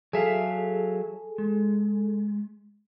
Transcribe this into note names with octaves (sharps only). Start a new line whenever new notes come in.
F#3 G#4 A4 E5 F5
G#3